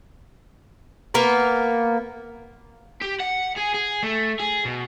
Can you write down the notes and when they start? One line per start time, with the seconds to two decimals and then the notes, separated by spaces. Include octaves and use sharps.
1.14 A#3 B3 A#4
3.01 G4
3.20 F#5
3.57 G#4
3.75 G#4
4.03 A3
4.40 G#4
4.66 B2